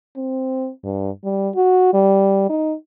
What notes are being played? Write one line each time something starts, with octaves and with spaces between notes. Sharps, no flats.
C4
G2
G3
F#4
G3
D#4